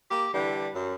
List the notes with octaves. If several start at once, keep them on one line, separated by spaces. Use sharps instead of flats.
A#3 G4
D3 E3 G3
F#2